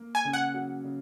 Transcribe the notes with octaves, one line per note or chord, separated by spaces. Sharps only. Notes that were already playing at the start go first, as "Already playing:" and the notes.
Already playing: A#3
G#5
C#3
F#5
F#3
C#3